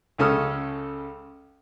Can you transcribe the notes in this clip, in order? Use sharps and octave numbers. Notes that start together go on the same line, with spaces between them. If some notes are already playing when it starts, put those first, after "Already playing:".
C#2 C#3 C#4 A4 D#6 F6